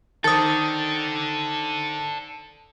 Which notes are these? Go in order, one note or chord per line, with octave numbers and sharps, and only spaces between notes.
D#3 A4 C5 D5 A5 D#6 A6